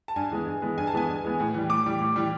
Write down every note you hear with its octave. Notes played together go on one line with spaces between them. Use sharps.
A5
G2 G#5
E3 G#3 B3
G2
E3 G#3 B3
G2 G#5
A5
E3 G#3 B3 G#5
G2
E3 G#3 B3
A2
E3 G3
A2 D6
E3 G3
A2
E3 G3